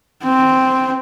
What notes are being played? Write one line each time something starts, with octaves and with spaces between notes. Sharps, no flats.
C4